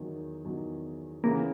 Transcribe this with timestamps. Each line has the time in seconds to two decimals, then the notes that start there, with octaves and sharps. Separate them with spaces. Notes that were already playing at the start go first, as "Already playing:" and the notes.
Already playing: E2 D#3 F#3
0.44 E2 D#3 F#3
1.24 C#3 E3 A#3 B3